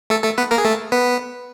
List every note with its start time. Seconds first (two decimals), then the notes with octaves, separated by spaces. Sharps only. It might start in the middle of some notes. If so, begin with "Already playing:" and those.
0.10 A3 A4
0.23 A3 A4
0.38 B3 B4
0.51 A#3 A#4
0.58 G#4
0.65 A3 A4
0.92 B3 B4